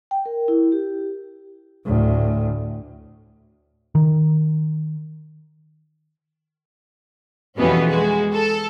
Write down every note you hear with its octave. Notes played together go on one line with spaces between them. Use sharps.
G5
A#4
E4
G4
D2 A2
D#3
F2 B2 E3 G3 B3 C#4
G#3 F#4
A4